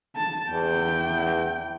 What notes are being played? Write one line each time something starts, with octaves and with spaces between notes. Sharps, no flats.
A5
E2 G5